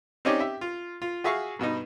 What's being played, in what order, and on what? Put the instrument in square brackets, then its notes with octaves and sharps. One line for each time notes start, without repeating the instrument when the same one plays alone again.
[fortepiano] C4 C#4 D#4 G4 C#5 D5
G4 E5
F4
F4
F#4 G#4 E5 F5 C#6
G2 B2 B3 D#4